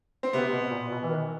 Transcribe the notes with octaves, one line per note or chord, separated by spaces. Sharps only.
C4
C3 B3
B2
A#2
B2
E3
D#3